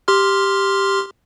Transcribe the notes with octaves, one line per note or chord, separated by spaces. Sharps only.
G4 C6 F6